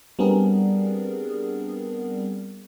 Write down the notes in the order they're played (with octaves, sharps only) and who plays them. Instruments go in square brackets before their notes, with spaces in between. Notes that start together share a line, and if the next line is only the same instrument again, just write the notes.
[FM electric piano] G3 B3 C4 D4 G#4 A#4